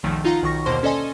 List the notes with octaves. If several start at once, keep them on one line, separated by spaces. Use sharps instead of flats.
B1 E2 A#2 D#3 F3 A3
D#4 F4 F5 F#5 A#5
B1 D#3 C#6 A#6
D#2 B2 D3 A#3 C5 C6
C#4 A4 D5 D#5 G#5 C6